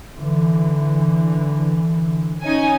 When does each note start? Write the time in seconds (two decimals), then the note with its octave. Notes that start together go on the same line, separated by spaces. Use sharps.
0.14 D3 E3
2.43 C#4 D#4 G#5